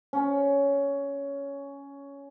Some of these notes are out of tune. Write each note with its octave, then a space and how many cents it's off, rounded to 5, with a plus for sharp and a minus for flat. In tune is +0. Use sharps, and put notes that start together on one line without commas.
C#4 +10